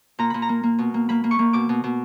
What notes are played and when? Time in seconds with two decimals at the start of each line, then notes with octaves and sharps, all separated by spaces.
0.19 A#2 A#5
0.30 A#2 B5
0.42 A#5
0.49 A#3
0.63 A#3
0.79 B2
0.94 A#3
1.09 A#3 B5
1.24 A#3
1.31 C#6
1.39 A#3
1.53 B2 D6
1.69 B2
1.84 B2